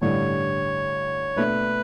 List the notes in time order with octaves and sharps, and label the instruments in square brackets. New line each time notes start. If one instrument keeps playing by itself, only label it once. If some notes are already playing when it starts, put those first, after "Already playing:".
[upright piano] A1 G2 D3 G3 D4 [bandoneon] C#5
[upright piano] B2 A3 D4 [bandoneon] B4